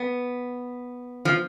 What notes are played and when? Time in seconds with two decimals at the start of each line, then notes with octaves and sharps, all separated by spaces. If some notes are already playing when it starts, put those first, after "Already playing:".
Already playing: B3
1.25 F3